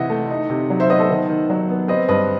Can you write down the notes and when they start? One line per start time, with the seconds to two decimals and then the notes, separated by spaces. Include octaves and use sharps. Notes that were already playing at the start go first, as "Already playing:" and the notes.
Already playing: C3 E3 D#5 E5 F#5
0.10 A3
0.31 D#4
0.50 C3
0.70 F#3
0.80 C5 E5
0.90 B3 B4 D#5
0.99 A4 C5
1.09 D#3
1.29 D#3
1.50 F#3
1.69 B3
1.88 C4 B4 D#5
2.09 G2 B4 D#5